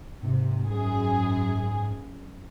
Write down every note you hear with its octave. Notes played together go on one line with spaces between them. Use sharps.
G#2 C3
F#2 G#4